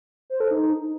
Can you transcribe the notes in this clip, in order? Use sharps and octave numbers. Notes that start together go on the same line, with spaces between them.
C5
A4
D#4